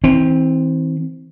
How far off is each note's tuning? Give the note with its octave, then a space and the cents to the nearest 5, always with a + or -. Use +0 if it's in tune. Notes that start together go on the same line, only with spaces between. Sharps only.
E3 -40 C4 +0